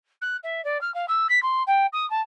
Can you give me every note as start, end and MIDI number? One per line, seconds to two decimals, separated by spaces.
0.21 0.37 90
0.43 0.63 76
0.64 0.80 74
0.81 0.93 89
0.94 1.06 77
1.08 1.27 88
1.29 1.41 95
1.42 1.63 84
1.67 1.86 79
1.93 2.08 87
2.10 2.21 81